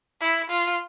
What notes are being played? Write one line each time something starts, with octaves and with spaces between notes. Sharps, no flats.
E4
F4